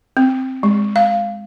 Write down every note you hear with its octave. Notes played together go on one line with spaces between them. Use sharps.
C4
G#3
F5